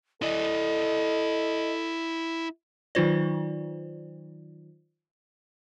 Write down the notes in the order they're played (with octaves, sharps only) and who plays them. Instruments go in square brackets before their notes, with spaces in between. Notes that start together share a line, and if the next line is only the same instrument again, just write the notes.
[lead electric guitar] E4 D5 [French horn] A4 [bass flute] D#5
[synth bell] D#3 F#3 D#4 F4 C5 D5